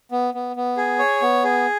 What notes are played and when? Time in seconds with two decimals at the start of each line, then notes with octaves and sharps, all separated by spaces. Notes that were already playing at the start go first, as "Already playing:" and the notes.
0.11 B3
0.34 B3
0.56 B3
0.77 G#4
0.99 C#5
1.22 B3
1.44 G#4